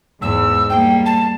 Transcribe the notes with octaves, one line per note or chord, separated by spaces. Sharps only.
E2 G#2 E6
G3 A#3 G5
A5